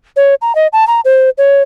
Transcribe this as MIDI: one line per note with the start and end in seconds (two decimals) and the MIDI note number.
0.16 0.35 73
0.42 0.55 82
0.55 0.67 75
0.73 0.87 81
0.87 1.01 82
1.05 1.30 72
1.38 1.62 73